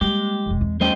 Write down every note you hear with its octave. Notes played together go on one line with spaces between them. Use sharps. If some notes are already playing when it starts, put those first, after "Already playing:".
G3 G#3 A#3 G4
E1 F2
E2 C4
G3 A3 C#4 C5 D#5 G5